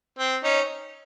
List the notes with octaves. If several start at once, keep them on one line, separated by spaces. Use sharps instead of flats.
C4
C#4 D#4